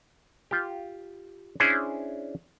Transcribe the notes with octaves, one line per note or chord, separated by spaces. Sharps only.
F4 G4
C#4 D4 E4 G#4 C5